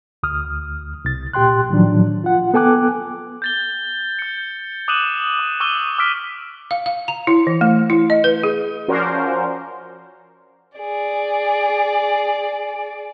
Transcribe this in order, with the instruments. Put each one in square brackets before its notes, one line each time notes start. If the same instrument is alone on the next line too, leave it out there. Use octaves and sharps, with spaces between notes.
[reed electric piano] D2 D#6 F6
C2 A6
A#2 G4 G5 C6 F#6
A2 D#3 F3 F#3 D4
F4 F#5
B3 A4 G5 G#5 D6 F#6
[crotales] G6 A6 G7
G6 C#7
D6 D#6 F#6 D#7 E7 F#7
D6
C#6 D6 E6 D#7 G7
D6 E6 F6 B6 D7
[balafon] F5
F5
A#5
E4
E3
A3
E4
D#5
B4
G#4
[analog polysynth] F3 C#4 F#4 A#4 C5 D5
[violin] G#4 D5